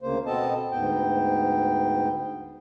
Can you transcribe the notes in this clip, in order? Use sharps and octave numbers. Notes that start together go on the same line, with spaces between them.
D2 C#3 A#3 C5
B2 B3 C4 A4 D#5 A5
D2 G#2 B3 G5